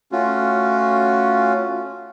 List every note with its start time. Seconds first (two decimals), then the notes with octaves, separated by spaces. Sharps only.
0.12 A3 C#4 F4 F#4